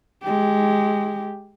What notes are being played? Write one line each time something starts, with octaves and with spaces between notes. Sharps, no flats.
G#3 G4